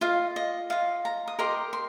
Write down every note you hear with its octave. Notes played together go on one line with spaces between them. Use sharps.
F4 D#5 F5
D#5
F4 D#5 F5
A#5
D#6
G4 A#4 D#5 C6
C6